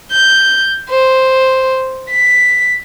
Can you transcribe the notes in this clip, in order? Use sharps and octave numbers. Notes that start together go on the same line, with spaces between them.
G6
C5
B6